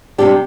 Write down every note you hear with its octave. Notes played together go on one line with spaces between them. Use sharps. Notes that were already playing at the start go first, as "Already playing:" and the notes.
C3 G3 D4 G4